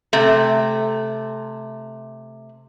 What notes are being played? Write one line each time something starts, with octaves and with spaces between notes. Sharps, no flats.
C3 A3